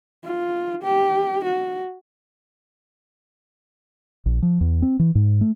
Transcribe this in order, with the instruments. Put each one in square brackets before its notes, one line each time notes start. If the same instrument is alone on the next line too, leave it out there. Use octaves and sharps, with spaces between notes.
[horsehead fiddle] F4
G4
F#4
[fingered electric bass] A#1
F3
E2
C4
E3
G#2
A3